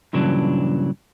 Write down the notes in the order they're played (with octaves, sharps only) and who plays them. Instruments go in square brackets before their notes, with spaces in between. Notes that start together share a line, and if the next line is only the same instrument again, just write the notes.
[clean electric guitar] G2 A#2 C#3 E3 F#3 D4